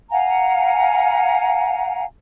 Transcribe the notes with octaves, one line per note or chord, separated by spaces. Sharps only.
F5 F#5 G#5 A#5